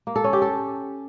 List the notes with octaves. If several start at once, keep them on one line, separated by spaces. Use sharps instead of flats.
A#3
A4
C#4
G4
A4